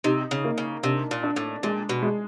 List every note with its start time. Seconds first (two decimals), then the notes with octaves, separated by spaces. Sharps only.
0.04 C3 D#4
0.31 C#3
0.45 A#3
0.58 C#3
0.83 C3 D4
1.11 A#2
1.23 D4
1.36 A2
1.63 A#2 G#3
1.89 B2
2.02 G#3